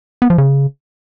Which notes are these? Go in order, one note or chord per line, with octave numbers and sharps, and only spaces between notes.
B3
F3
C#3